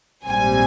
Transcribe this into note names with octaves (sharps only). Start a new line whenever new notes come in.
A#1 G#2 G3 C4 G#5